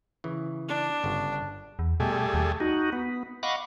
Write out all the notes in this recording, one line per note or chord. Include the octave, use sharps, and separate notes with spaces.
C#3 E3
D4
G1 C#3
E2
B2 G3 A3 G#4
D#2
D#4 F#4
B3
D#5 F5 F#5 B5 C#6 D6